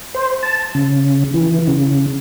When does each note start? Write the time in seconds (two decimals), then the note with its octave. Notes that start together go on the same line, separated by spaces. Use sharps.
0.15 C5
0.43 A5
0.75 C#3
1.34 E3
1.67 C#3